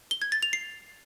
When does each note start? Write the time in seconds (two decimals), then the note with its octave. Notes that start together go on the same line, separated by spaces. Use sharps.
0.11 G7
0.22 G#6
0.32 A6
0.43 F7
0.53 C7